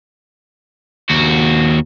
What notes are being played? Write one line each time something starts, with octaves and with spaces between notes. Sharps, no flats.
D#2 F#4